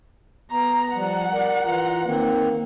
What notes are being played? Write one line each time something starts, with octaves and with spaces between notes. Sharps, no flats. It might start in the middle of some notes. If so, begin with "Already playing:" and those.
B3 A#5
F3 G3 F#5
A#4 D5
E3 F4 A#5
D#3 A#3 C4